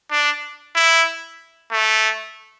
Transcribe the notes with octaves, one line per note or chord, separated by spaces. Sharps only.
D4
E4
A3